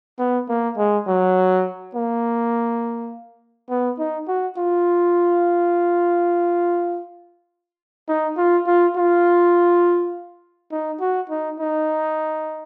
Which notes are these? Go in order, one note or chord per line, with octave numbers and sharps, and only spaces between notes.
B3
A#3
G#3
F#3
A#3
B3
D#4
F#4
F4
D#4
F4
F4
F4
D#4
F#4
D#4
D#4